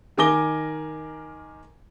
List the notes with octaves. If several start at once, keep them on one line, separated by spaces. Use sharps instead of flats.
D#3 A#4 G#5 D6 A#6 G7